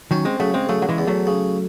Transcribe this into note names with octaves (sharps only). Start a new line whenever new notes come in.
D#3 F#3 C#4
G#3 C4
C#3 F#3 A3
G#3 C4
C#3 F#3 A3
F#3
E3 G#3
E2
F#3 A3
C#3